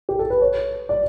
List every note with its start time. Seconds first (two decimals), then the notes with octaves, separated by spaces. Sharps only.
0.09 G4
0.19 A4
0.30 B4
0.41 C#5
0.89 D5